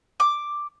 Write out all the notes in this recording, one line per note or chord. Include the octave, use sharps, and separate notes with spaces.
D6